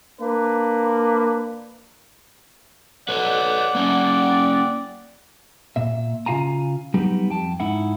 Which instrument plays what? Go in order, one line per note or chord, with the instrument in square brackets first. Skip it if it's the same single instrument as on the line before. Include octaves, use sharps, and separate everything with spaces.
[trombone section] A#3 D4 B4
[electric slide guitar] A4 B4 C#5 [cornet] D5 [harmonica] F#5
[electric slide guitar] A#3 C#4
[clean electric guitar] A#2 E5
C#3 F4 F5 G#5 A#5
F#3 G3 B3 D#4 G4
F2 G5 A5
G#2 D#4 E4 F#5